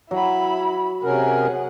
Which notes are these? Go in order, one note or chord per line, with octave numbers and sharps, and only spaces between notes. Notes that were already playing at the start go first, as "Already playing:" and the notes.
F#3 E4 B5
C3 C#4 G#4 A#4 F#5